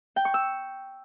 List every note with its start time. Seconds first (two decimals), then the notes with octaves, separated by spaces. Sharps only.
0.16 G5
0.25 C#6
0.34 E6